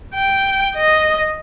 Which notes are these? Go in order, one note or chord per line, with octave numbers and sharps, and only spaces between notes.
G5
D#5